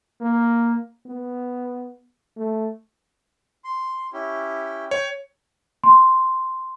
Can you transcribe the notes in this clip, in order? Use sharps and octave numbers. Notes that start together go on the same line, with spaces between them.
A#3
B3
A3
C6
C#4 E4 G4
C#5 G5
C6